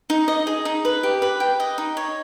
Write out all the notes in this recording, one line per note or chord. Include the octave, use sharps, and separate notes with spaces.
D#4
D#5
G#4
D#4
B4
G4
B4
G5
D#5
D#4
C#5